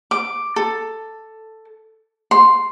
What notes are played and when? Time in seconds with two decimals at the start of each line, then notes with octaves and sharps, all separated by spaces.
0.11 D6
0.56 A4
2.31 C6